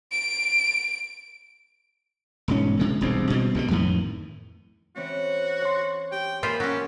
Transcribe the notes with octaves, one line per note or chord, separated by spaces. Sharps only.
D7
E1 G#2 C#4
C3 G#3
E1 C2 G#2 C4
B2 G3 C4
B1 B2 D3 G3
F2 A2 D#3 E3
E3 C4 C#4 F#4
C#5 C6
G4 G5
A#2 E3 F4 C5 B5
F#3 C#4 G4